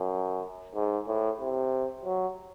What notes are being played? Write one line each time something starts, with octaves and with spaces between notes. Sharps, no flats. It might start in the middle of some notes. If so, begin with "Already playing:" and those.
Already playing: F#2
G#2
A2
C3
F#3